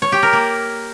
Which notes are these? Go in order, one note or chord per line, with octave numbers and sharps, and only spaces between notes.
C#5
G4
A#4
A#3